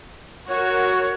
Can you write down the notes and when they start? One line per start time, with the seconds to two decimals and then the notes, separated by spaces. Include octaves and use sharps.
0.48 F#4 A#4 C#5